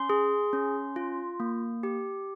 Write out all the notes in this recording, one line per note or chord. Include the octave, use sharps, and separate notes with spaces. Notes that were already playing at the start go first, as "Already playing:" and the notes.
Already playing: C#4 C6
G#4
C#4
F4
A#3
G4